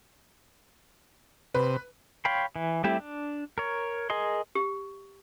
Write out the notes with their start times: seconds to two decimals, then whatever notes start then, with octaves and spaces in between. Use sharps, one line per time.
1.55 C3 B4
2.25 C#5 F5 G5 B5 C6
2.56 E3
2.84 G3 A3 C4 E4 G4
3.00 D4
3.58 A#4 C#5
4.10 G#4 A#4 D#5 C6
4.55 G4